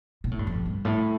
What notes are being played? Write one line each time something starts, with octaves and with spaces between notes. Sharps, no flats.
A#2
A2
G2
F2
G2
A2